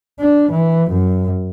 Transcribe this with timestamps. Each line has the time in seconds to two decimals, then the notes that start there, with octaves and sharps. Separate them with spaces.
0.20 D4
0.52 E3
0.90 F#2